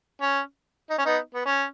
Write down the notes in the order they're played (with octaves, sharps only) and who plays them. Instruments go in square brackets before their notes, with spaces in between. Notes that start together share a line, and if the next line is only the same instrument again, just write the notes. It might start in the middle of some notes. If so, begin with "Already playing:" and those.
[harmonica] C#4
D#4
C#4
B3 D#4
B3
C#4